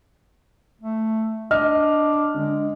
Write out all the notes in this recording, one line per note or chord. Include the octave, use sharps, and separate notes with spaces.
A3
D4 D#5 F6
D3 G#3